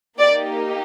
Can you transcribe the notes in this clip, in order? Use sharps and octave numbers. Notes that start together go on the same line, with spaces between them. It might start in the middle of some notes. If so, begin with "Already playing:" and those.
A#3 D#4 G4 D5